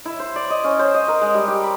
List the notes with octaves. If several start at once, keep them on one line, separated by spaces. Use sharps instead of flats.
E4
C5
D5
D#5
C#4
C5
D#5
A#4
G#3
G3
G4
B5